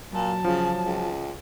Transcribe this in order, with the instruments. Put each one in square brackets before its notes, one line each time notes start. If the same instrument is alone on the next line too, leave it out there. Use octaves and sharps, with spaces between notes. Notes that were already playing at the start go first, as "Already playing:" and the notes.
[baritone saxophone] A#2 [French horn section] F#3 [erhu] A5
[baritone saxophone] C#3 [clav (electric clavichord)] F3
[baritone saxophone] C#2